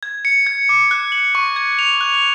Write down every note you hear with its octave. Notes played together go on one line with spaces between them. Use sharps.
G#6
C#7
G#6
D6
F#6
F#7
C#6
G#6
F7
F#6